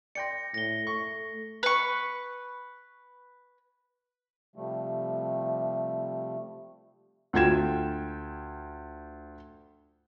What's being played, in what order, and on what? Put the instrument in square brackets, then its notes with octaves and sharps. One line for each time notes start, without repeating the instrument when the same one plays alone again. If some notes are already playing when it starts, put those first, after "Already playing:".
[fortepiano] D5 G5 C6 [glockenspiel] A#6 C#7
[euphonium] A2 [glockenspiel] A#6 G7
[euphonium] A3 [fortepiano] C#6
[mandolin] B4 C#6
[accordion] C3 F3 G3 A3
[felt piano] D2 F4 G5 G#6 E7